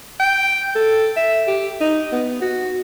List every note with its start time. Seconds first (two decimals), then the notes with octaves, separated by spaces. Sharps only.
0.20 G5
0.75 A4
1.17 E5
1.47 G4
1.81 D#4
2.13 B3
2.42 F#4